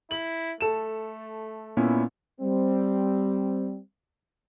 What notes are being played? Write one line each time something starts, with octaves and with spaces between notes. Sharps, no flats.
E4 F#7
A3 A4 E7
A#2 B3 C#4 E4
G3 C4